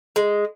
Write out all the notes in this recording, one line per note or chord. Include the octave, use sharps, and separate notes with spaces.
G#3